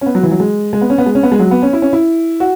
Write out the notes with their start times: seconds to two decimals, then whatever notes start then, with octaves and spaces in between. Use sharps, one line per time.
0.01 C#4
0.06 B3
0.15 F#3
0.23 E3
0.31 F#3
0.40 G#3
0.73 G#3
0.81 B3
0.90 C#4
0.98 B3
1.06 G#3
1.15 C#4
1.23 B3
1.32 G#3
1.39 F#3
1.51 B3
1.62 C#4
1.73 E4
1.82 C#4
1.93 E4
2.40 F#4